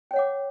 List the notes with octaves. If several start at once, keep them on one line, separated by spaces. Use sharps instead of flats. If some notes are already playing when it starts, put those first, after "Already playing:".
C#5 F#5 G5 D6